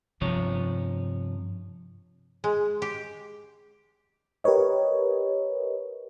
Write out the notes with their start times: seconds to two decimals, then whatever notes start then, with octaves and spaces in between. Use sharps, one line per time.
0.21 G2 C3 F3 C#5
2.44 G#3
2.82 G4
4.44 G4 A#4 B4 C#5 D#5